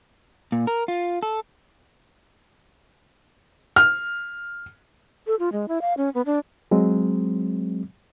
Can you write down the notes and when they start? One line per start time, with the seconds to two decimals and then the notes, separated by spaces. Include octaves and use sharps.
0.52 A#2
0.67 A#4
0.88 F4
1.23 A4
3.76 F6
5.27 A4
5.39 F4
5.52 G#3
5.68 E4
5.81 F5
5.97 C#4
6.15 B3
6.26 D4
6.71 F#3 G#3 C4